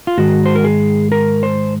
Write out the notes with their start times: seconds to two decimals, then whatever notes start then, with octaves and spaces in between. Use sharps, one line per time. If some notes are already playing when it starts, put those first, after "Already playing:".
0.07 F4
0.18 G#2 D#3 G#3 F#4
0.46 C5
0.55 A#4
0.64 G#4
1.12 A#4
1.43 C5